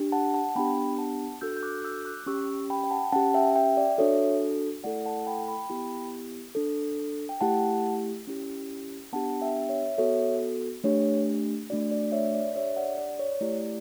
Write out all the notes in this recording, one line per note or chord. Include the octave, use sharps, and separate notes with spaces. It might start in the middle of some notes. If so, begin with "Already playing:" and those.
Already playing: D4 G4
F#5 A5
F#5 A5
B3 D4 G4 G5 B5
F#5 A5
D4 F#4 A4 E6 G6
G6
D6 F#6
E6 G6
D6 F#6
C#4 G4 C#6 E6
G5 B5
G5
F#5 A5
C#4 G4 F#5 A5
E5 G5
E5 G5
D5
D4 F#4 A4 C#5 E5
A3 E4 A4 D5 F#5
F#5 A5
G5 B5
G5 B5
B3 E4 G4
D4 A4
G5
A3 E4 G4 F#5 A5
C#4 E4 G4
B3 D4 G4 F#5 A5
E5 G5
C#5 E5
B3 F#4 A4 C#5 E5
A3 D4 G4 C#5
A3 D4 F#4 D5
D5
C#5 E5
D5
D4 G4 C#5 E5
D5 F#5
D5
C#5
A3 E4 G4 D5